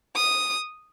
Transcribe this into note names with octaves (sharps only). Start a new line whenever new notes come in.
D#6